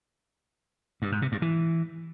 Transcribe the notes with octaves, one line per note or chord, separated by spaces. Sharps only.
G2
G#2
C3
G2
E3